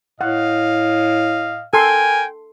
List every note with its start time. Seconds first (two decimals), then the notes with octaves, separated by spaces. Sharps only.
0.21 A2 D#5 F5 F#5
1.73 A4 A#4 G5 G#5 C6